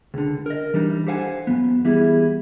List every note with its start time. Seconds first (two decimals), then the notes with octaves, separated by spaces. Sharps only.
0.14 C#2 D3
0.46 A#4 D#5
0.74 E3 G3 D4 D#4
1.07 G4 A4 C5 F5 F#5 G#5
1.47 F#2 F3 B3
1.85 E3 G3 B3 E4 G#4